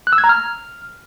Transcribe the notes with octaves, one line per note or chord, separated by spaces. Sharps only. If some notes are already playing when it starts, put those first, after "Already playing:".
F#6
E6
G#6
A#5
F6